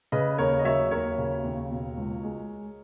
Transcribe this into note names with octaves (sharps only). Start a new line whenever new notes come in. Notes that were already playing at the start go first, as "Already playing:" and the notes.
C#3 B4 D#5
D#2 A#4 C#5
D#5
F#3 C#5 E5
D#2 A#4 C#5
C#3
D#2
B2
C#2
G#3